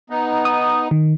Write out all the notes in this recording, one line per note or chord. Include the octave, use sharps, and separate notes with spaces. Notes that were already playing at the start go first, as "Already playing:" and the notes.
B3 D#4
D#6
D#3